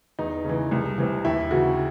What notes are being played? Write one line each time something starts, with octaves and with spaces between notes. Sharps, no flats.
E2 D#4
C#3 E3
C2
C3 E3
D#2 E4
C#3 E3 F#4